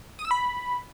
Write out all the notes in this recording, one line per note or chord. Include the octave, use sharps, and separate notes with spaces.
D#6
E6
B5